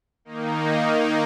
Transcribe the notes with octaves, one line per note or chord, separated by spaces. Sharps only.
D#3 A#3 D#4